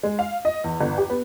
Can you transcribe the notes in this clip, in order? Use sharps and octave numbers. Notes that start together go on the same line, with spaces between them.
G#3
F5
D#5
E2
G1
G4
B3